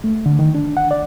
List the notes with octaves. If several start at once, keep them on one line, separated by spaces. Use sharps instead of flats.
A3
D3
D#3
D4
F#5
D5